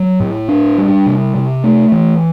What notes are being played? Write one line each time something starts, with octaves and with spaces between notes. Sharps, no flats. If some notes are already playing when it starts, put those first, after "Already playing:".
Already playing: F#3
A2
D4
G3
C3
C3
A3
E3